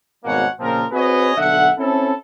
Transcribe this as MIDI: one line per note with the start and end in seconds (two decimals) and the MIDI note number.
0.25 0.46 32
0.25 0.46 47
0.25 0.46 55
0.25 0.46 58
0.25 0.46 73
0.25 0.46 78
0.60 0.85 46
0.60 0.85 49
0.60 0.85 53
0.60 0.85 60
0.60 0.85 70
0.92 1.33 60
0.92 1.33 66
0.92 1.33 68
0.92 1.33 71
0.92 1.33 73
0.92 1.33 75
1.37 1.70 35
1.37 1.70 50
1.37 1.70 76
1.37 1.70 78
1.78 2.14 60
1.78 2.14 61
1.78 2.14 64
1.78 2.14 69